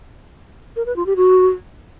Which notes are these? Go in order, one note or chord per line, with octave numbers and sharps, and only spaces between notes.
A#4
B4
F4
G4
F#4